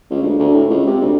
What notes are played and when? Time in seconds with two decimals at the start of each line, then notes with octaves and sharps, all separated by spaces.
0.11 C#2
0.23 D2
0.39 D2
0.54 A2
0.69 C#2
0.87 C3
1.01 D2